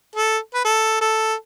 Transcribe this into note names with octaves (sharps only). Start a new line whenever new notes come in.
A4
B4
A4
A4